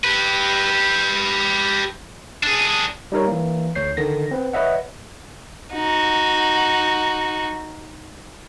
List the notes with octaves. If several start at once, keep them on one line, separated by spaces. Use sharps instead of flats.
G4 B4
D4 G#4
G3 D#4 A#4 C#5
E3 A#3
D2 C#5 G6 C7
D3 D#3 A#6
C4 B4
B4 C#5 D#5 E5 F#5
D#4 F#4